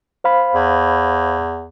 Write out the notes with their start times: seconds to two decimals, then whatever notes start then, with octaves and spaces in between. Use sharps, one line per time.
0.24 C5 F5 B5
0.55 E2